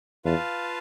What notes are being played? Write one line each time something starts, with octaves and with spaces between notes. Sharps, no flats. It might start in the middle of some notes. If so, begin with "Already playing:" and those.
E2 F4 B4 F5 A5